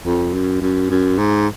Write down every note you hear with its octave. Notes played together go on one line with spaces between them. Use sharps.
F2
F#2
F#2
F#2
G#2